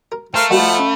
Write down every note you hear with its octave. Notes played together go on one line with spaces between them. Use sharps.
A#4
A3 A#4 C5 F5
F3 G3 A#3 F#4 D#5 F5 F#5 B5
C#4 B5